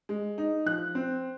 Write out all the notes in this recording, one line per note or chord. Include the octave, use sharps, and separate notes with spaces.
G#3
D#4
F3 F#6
C4